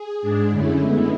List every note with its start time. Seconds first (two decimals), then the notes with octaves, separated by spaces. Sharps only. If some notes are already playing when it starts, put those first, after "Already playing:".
Already playing: G#4
0.21 G#2 G#3 D4
0.50 F#2 D3 A3 C#4 E4
0.79 D3 G#3 B3